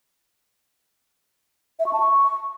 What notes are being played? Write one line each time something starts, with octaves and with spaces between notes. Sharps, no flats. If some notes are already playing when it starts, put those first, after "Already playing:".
E5
C#6
A5
C#6